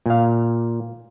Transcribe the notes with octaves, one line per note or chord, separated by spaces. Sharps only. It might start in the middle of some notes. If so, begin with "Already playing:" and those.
A#2 F5